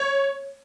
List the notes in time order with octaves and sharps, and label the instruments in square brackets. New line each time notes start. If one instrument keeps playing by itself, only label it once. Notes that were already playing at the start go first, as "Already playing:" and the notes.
Already playing: [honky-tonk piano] C#5